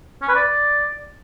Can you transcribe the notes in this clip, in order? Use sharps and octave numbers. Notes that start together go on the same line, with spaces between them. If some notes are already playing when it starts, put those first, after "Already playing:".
C#4
B4
D5